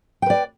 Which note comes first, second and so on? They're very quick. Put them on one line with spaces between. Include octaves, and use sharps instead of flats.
G5 B4 D5